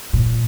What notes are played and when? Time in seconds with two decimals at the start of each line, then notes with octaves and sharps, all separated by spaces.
0.13 A#2